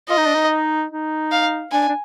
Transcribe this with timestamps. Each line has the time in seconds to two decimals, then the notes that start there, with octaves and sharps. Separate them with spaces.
0.09 F4 D#5
0.17 D#4
0.26 D4
0.35 D#4
0.91 D#4
1.31 F5
1.72 D4 G#5
1.88 D4